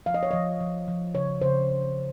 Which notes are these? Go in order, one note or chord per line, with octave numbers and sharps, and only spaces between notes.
F3 F5
D#5
C#5
F3 D#5
F3
F3
C#3 C#5
C#3 C5